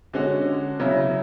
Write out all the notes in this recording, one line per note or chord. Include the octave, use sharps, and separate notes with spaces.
D3 G#3 C#4 F#4
C#3 F#3 C#4 E4